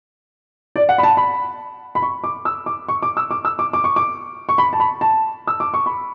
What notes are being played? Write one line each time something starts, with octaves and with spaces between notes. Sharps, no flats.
D5
F#5
B5
A5
B5
B5
C#6
D6
E6
D6
C#6
D6
E6
D6
E6
D6
D6
C#6
D6
C#6
B5
A5
B5
A5
E6
D6
C#6
B5